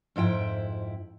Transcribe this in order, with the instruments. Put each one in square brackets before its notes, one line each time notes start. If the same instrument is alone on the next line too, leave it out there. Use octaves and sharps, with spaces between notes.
[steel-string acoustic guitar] F2 G#2 E4 G5